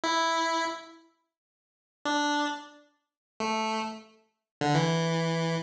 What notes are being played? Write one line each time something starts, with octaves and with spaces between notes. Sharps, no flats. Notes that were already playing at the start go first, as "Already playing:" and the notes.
E4
D4
A3
D3
E3